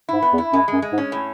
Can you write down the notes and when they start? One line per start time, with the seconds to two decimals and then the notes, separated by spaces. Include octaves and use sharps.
0.09 G#2 E4
0.22 B3
0.33 E2
0.38 E4
0.53 F#2 G#3
0.68 G#3
0.73 F#2
0.82 G#3
0.93 G#2
0.98 C#4
1.12 A2